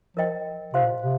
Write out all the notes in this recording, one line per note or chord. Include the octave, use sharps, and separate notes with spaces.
F3 A#4 D#5 G5
C3 C5 F5 C6
A#2
C3